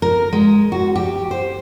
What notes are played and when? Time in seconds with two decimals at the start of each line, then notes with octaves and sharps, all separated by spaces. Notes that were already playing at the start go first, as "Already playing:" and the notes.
0.02 A#4
0.33 G#3
0.72 F#4
0.96 G4
1.31 C5